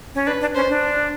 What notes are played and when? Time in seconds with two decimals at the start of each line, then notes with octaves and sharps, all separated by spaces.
0.15 C#4
0.27 D4 B4
0.41 D4
0.55 C#4 C5
0.69 D4